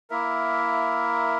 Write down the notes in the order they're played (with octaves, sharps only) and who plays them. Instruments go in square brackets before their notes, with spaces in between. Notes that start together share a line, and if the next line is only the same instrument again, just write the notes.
[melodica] A#3 E4 A#4 E5